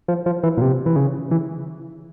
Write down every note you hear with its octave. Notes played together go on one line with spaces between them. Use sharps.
F3
F3
E3
A#2
C3
E3
C#3
E3